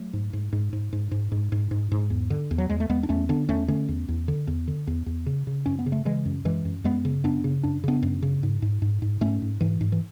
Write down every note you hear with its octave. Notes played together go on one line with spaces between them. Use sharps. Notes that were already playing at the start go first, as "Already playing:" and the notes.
Already playing: F#3 A3
G#2
G#2
G#2
G#2
G#2
G#2
G#2
G#2
G#2
G#2
E2
D3
E2
F#3
E2 G#3
A3
E2 G#3 B3
D4
E2 A3 C#4
D3 B3 D4
E2 A3 C#4
D3 A3 C#4
E2
E2
D3
E2
D3
E2
E2
C#3
C#3
F#2 C#4
B3
C#3
A3
C#3 E3 G#3
F#2
F#2 E3 G#3
F#2
F#2 G#3 B3
C#3
F#2 B3 D4
C#3
F#2 D4
C#3 B3 D4
F#2
C#3
G#2
G#2
G#2
G#2
G#2 A3 C#4
G#2
G#2 E3
G#2
E3